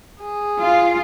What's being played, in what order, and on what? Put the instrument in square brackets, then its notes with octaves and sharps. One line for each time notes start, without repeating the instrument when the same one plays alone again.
[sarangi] G#4
[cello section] F4